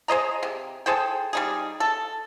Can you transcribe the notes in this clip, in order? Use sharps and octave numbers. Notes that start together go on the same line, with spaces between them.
G#4 C5 D#5 A#5
C3
G#4 A4 C5 G5
G3 D#4 G#4
A4